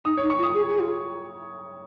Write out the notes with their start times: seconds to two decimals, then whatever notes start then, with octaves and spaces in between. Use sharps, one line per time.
0.05 D#4 D#6
0.17 C#5
0.22 D#4
0.30 C#6
0.38 F4
0.43 D#6
0.54 G#4
0.69 G#4
0.79 F4